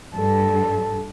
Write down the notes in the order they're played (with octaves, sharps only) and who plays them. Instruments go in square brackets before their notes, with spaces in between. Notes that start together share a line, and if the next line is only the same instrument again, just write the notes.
[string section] G2 [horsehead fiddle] A4